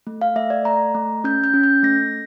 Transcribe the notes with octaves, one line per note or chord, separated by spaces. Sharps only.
A3
F5
A3 E5
D5
A3 A#5
A3
C#4 G6
G6
C#4
G6
A3 A#6